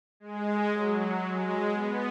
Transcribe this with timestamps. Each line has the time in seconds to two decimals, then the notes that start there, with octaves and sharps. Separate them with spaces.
0.20 G#3
0.71 F#3
1.21 G#3
1.73 B3